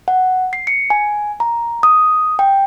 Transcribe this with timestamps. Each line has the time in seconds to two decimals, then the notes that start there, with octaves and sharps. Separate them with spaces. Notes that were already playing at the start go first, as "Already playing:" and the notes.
0.08 F#5
0.53 C7
0.67 C#7
0.90 G#5
1.40 A#5
1.83 D#6
2.39 G5